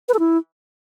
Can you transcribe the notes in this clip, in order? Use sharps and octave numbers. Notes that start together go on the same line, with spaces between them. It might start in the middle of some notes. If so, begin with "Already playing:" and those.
B4
A4
E4